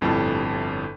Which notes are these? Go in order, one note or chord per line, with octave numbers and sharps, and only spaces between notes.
G1 F2 A2 G3 A4 A5